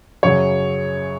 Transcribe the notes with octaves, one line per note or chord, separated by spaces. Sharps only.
F#2 C#3 F#3 C#5